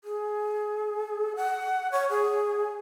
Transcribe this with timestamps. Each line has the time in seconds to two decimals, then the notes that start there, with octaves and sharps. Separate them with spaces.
0.04 G#4
1.36 F#5
1.92 C#5
2.10 G#4